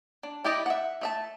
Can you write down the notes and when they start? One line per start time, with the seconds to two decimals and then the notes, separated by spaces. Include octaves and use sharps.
0.23 D4
0.44 G3 E4 G4 D5 D#5
0.66 E5 F#5
1.01 A3 E5 A5